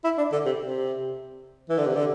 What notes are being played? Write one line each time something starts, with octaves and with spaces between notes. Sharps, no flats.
E4
D4
D3
C3
C3
E3
D3
C3
D3